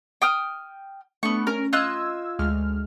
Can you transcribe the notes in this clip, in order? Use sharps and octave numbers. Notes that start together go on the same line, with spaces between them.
G5 D#6 F6
A3 B3 D4 C#6
C#4 A#4 F6
F4 D#5 E6 F#6 G#6
D2 G#3 F6